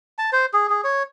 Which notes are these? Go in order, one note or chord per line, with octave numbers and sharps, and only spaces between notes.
A5
C5
G#4
G#4
C#5